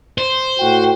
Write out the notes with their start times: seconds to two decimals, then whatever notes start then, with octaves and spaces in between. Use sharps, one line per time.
0.18 C5
0.59 A2 F#4 G5